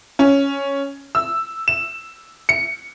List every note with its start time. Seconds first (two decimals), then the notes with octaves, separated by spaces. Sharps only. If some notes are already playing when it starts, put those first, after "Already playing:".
0.19 C#4
1.15 E6
1.68 E7
2.49 C#7